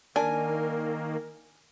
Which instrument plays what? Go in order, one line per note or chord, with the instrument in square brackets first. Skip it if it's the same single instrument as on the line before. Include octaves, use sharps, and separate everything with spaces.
[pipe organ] D#3 A#3 [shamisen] D4 [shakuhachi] A#4 [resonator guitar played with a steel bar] G#5